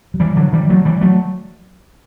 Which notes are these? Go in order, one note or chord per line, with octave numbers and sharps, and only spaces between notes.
F#3
E3 G3
D3 F#3
E3 G3
F#3 A3
E3 G3
F#3 A3